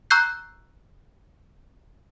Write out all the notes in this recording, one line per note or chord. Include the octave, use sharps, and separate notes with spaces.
A#5 C#6 E6 F#6 G6 C7